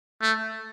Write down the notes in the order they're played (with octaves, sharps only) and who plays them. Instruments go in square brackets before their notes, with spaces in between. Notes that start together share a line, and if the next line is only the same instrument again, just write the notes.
[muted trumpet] A3